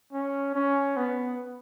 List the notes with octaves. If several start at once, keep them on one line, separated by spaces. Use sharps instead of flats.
C#4
C#4
B3